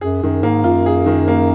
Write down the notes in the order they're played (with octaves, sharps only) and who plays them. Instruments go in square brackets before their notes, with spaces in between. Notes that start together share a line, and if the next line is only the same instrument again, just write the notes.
[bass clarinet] F#2 [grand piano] G#4
[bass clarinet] F#2 [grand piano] D#3
[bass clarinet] G#2 [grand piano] A#3
[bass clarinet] F#2 [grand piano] F4
[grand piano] G#4
D#3
A#3